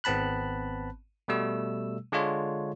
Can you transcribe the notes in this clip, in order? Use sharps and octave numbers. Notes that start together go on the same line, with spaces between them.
G#1 B3 C4 A5 B5 F#6
B2 G3 A3 E6
D3 G#3 D4 F4 C#5